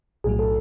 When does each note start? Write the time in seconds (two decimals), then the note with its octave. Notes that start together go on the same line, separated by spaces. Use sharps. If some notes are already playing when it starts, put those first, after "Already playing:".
0.24 B1 A2 F#3 G#4
0.39 A4